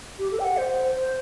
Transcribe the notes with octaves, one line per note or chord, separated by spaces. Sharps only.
G4
A4
G5
F#5
C5
C5